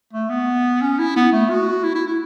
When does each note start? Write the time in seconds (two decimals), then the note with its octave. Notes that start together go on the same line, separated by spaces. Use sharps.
0.13 A3
0.30 B3
0.81 C#4
0.99 E4
1.16 B3
1.32 A3
1.50 F#4
1.84 E4
1.95 E4
2.07 E4